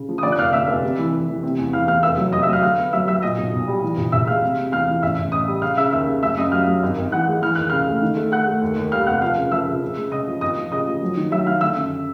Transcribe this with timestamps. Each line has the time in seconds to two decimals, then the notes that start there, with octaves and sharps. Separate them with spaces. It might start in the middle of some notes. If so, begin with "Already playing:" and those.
Already playing: C#3
0.09 F3
0.18 D#6
0.23 D3 D5 D6
0.32 F#6
0.38 F1 F5 F6
0.53 D3 E5 E6
0.68 F1
0.83 C3
0.98 E3
1.13 E3
1.28 E3
1.43 C3
1.58 E2
1.73 E3 F5 F6
1.88 E2 F5 F6
2.03 F1 E5 E6
2.18 F#3
2.32 F1 D#5 D#6
2.42 E5 E6
2.48 F#3 F5 F6
2.63 D3 F5 F6
2.78 B3
2.93 F#3 E5 E6
3.07 F#3 E5 E6
3.22 A#2 D#5 D#6
3.38 B1
3.53 B1
3.68 G3
3.82 E3
3.97 A#1
4.12 A#1 E5 E6
4.27 G#3 F5 F6
4.42 C3
4.58 C3
4.72 E2 F5 F6
4.87 E3
5.03 A1 E5 E6
5.18 A1
5.32 A1 D#5 D#6
5.48 G3
5.62 C#3 F5 F6
5.77 C#3 E5 E6
5.92 D#2 E5 E6
6.08 C#3
6.23 F#2 E5 E6
6.37 F#2 D#5 D#6
6.52 F#3 F5 F6
6.67 F#3
6.83 G#1
6.98 G#1
7.12 E3 F#5 F#6
7.28 G#3
7.42 E3 F6
7.55 D#2 F#6
7.70 C#3 F5 F6
7.87 A3
8.02 D#3
8.17 A3
8.32 A3 F#5 F#6
8.47 A3
8.62 D#2
8.76 D#2
8.92 G3 F5 F6
9.07 F1 F#5 F#6
9.22 F3 F5 F6
9.36 C#3
9.52 F3 E5 E6
9.67 C#3
9.82 C#3
9.97 G#3
10.12 C#3 D#5 D#6
10.27 F3
10.41 G#1 D#5 D#6
10.57 F3
10.71 C#3 D#5 D#6
10.87 F3
11.02 F#3
11.17 D#3
11.32 F#3 E5 E6
11.46 D#3 F5 F6
11.61 D3 E5 E6
11.77 F#2